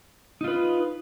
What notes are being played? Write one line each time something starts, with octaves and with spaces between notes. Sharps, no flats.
D#4 F4 B4